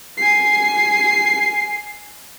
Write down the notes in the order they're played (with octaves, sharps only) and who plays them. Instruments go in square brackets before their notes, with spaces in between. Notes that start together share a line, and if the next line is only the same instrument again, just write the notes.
[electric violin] G#5 C7